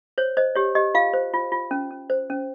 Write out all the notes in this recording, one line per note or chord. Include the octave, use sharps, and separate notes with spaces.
C5 C#5
C5 D#5
G4 C#5
G4 D#5
F4 F5
C5
F4
F4
C#4
C#4
C5
C#4